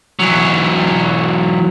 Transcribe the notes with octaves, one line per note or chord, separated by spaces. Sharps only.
E3 F#3